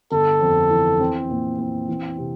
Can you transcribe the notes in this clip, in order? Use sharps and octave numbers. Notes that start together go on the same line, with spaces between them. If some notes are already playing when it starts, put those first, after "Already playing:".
G1 A4
F2
E3
C4
A#2
C4
E3
C3